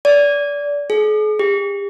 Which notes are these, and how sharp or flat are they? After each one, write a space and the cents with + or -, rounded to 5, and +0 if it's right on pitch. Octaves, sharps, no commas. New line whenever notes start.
D5 -25
G#4 +45
G4 +45